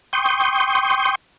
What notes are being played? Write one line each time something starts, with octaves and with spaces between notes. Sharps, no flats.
G5 C6 C#6 D#6 G6